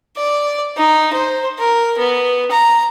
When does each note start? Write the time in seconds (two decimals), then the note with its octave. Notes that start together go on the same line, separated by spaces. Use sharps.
0.16 D5
0.77 D#4
1.14 C5
1.59 A#4
1.98 B3
2.51 A#5